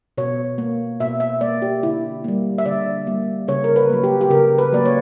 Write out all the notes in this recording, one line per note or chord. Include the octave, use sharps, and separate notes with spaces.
B2 C#5
A#3
B2 E5
E5
A#3 D5
G4
D3 E4
G3 A#3
E5
D3 D5
G3 A#3
C#3 C#5
A#4
B4
F#3 A#3
G4
G4
C#3 A#4
B4
F#3 A#3 D5
C#5